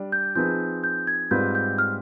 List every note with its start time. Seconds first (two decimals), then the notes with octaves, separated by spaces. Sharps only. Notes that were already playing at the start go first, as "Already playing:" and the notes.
Already playing: G3 D4
0.12 G6
0.35 F3 C4 D#4 G#4 B4 G6
0.84 G6
1.07 G#6
1.31 G#2 G3 C4 F4 B4 G6
1.55 G6
1.79 F6